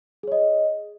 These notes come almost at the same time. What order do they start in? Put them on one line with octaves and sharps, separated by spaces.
G#4 C#5 D#5